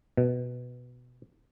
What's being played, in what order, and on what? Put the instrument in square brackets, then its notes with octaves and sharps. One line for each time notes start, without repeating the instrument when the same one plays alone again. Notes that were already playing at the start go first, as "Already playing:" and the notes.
[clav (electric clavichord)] B2